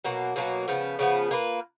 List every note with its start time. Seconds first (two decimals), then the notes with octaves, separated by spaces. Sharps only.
0.05 B2 F#3 A#3
0.36 B2 F#3 A#3
0.68 C#3 F3 B3
0.99 C#3 F3 B3
1.31 A#3 F4 B4